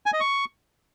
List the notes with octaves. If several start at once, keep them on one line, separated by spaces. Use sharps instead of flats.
G#5
D#5
C#6